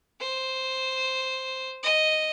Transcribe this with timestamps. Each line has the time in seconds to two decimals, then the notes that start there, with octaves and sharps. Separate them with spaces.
0.20 C5
1.83 D#5